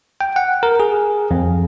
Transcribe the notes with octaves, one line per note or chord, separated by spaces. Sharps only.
G5
F#5
A#4
G#4
F2